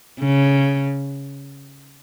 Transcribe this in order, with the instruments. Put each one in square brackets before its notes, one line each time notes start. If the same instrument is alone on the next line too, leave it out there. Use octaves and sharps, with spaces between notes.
[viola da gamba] C#3